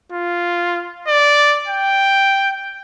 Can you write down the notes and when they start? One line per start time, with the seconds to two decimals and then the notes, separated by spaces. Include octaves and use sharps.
0.12 F4
1.08 D5
1.68 G5